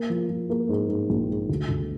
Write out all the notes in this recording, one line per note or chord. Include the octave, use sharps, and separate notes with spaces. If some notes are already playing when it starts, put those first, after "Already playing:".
Already playing: A#3
F3
F3
A#3
G#2
G#2
A#1
G#2
D2
D2